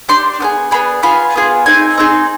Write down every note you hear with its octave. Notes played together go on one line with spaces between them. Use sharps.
D4 G4 C6
B3 D4 G#4
B3 D4 G#4 B5
B3 F4 G#4 B5
B3 F4 G#4
C4 D#4 G#4 G#5
C4 D#4 G#4